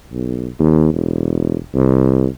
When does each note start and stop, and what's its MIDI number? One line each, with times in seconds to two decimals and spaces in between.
0.12 0.47 35
0.59 0.90 39
0.93 1.56 28
1.75 2.25 36